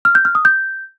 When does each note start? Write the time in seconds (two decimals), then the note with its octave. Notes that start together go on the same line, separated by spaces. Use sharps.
0.05 F6
0.15 G6
0.25 F6
0.35 D#6
0.45 G6